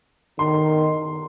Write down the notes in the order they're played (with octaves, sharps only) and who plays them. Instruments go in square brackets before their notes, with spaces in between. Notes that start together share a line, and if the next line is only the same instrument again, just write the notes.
[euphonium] D#3 [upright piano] C6